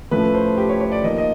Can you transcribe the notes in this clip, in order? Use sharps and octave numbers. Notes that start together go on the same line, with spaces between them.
A2 F3 A3 C#4 B4
C5
G4
C#5
C#5
D5
F3 A#3 D#4 D#5
D#5